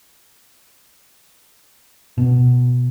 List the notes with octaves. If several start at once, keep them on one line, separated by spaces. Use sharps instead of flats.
B2